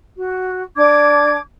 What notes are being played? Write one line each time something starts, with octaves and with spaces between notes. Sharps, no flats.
F#4
D4 D6 G#6